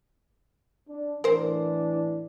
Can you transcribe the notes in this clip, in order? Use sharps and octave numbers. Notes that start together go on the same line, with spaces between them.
D4
A2 E3 D4 A#4 C5